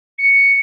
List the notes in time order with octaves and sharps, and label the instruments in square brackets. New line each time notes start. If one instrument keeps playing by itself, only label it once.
[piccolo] C#7